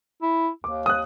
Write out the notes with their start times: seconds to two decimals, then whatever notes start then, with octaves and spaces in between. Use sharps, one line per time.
0.22 E4
0.64 D#2 D6
0.86 D#6 F#6